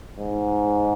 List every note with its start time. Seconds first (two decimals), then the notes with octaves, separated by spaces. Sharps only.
0.20 G#2